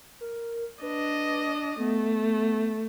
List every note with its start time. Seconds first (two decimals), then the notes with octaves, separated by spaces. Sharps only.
0.21 A#4
0.82 D4 B4 D#5
1.79 A3 B3